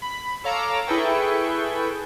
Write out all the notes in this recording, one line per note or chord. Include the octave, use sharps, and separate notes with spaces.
B5
A4 C#5 F5 A#5 D6 E6
E4 G#4 A4 B4 G5 C#6